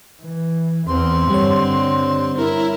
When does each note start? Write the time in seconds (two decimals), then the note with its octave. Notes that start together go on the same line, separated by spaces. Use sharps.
0.22 E3
0.87 E2 C4 C6
1.30 G2 D3 G3 C#5
2.37 E4 A#4